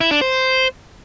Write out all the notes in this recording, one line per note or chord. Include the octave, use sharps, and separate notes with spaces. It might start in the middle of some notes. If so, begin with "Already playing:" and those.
E4
D4
C5